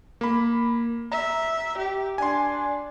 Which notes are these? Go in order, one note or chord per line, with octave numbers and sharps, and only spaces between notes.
A#3 B5
E5 A#5
G4
D4 G#5 C6